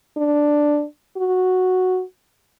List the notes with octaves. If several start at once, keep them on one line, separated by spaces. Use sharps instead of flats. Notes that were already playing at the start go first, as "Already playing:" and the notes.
D4
F#4